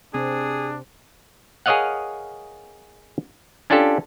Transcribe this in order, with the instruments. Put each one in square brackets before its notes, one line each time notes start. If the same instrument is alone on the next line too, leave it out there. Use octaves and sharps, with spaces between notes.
[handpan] C3 C4 [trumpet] D4 [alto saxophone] G#4
[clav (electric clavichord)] G#4 A#4 C#5 D#5 F5 F#5
C#4 D4 F4 G4 A4